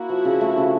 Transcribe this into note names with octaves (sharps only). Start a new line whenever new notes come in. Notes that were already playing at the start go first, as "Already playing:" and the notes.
Already playing: A#3 E4 F#4
F3
C#3
A3
C#3